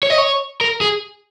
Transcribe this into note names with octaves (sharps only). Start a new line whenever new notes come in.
C#5
D#5
C#5
A#4
G#4